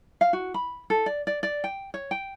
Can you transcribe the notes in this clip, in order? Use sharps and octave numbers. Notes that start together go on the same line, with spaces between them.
F5
F#4
B5
A4
D5
D5
D5
G5
C#5
G5